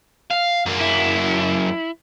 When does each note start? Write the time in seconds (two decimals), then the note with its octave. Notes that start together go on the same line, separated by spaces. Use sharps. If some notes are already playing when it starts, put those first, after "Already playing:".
0.30 F5
0.66 F#2 A#3
0.81 E4